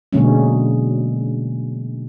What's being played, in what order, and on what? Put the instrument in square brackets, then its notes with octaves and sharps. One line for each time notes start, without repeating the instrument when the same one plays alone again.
[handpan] B2 D3 F#3 G#3 A#3 C#4